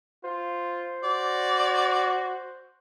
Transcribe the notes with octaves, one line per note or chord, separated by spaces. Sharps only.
F4 C5
F#4 D5